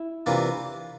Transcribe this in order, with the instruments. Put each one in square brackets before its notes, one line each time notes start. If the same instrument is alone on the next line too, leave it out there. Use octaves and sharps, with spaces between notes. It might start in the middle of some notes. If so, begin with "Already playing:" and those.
Already playing: [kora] E4
[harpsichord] C3 E3 A#3 D4 F4